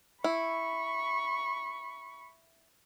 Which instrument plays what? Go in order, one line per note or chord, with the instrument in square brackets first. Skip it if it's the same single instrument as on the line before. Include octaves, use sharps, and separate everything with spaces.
[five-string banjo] E4 [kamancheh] B5 C#6